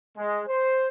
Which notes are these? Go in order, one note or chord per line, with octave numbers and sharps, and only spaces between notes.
G#3
C5